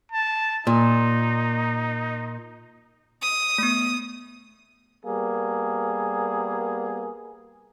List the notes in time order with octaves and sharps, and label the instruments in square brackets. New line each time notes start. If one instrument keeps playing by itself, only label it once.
[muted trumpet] A5
[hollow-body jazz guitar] A#2 [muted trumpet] D#4
[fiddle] D#6
[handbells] A3 B3
[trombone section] G3 A#3 B3 G#4